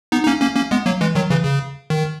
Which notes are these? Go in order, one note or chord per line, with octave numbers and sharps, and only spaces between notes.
B3 D#4
D#4
A#3 C#4
A#3 C#4
A#3 C#4
G#3 B3
F#3 A#3
E3 G#3
D#3 F#3
C#3 E3
C#3
D#3